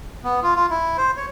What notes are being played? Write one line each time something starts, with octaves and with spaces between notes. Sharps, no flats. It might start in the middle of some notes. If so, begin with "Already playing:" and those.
B3
F4
F4
E4
C5
C#5